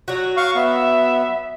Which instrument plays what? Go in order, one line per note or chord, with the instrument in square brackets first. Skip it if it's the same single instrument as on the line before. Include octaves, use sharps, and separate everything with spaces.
[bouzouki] F#3 F#4
[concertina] F5 C#6
[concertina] B3 [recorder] E5